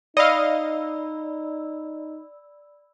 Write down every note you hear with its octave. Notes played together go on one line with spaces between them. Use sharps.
D#4 D5 D#5 F5 B5 E6